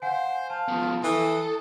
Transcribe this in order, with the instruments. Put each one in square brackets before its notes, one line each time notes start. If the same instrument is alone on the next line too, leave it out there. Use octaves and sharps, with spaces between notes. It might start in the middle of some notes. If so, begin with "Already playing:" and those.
[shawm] C5 [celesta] F5 F#5 G#5
[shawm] F5 [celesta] A5
[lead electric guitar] F3 B3
[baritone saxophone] E3 [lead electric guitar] A4 [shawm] D#6